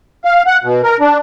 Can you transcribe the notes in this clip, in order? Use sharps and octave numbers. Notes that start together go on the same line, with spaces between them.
F5
F#5
B2
A#4
D4